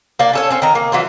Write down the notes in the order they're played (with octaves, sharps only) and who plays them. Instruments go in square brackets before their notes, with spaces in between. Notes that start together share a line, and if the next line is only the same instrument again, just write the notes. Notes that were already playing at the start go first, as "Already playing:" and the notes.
[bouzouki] A#3 D4
C#4 A4 C#5
C4 C#4
D#3 A#5
A#3
E3 F#3 F4